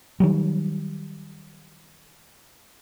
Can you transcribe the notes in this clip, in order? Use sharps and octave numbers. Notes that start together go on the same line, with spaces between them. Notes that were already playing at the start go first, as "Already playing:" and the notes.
D#3 F#3 G3